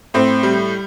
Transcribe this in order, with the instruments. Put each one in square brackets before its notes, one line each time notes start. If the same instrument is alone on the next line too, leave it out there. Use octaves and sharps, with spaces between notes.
[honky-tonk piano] A2 C4
G3